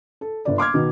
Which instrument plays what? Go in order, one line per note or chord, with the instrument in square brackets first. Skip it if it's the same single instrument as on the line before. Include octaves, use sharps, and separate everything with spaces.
[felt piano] A4
G1 D5
C6 D6 F6 G#6
B2 D#3